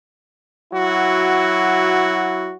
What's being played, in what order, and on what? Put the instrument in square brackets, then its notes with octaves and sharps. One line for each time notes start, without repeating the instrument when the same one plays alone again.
[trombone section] F#3 E4 F#4